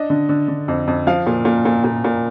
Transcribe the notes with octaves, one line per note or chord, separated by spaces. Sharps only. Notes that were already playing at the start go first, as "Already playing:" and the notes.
Already playing: D4 D#5
D3
D3
D3
F2
F2
F3 F5
A#2
A#2
A#2
A#2
A#2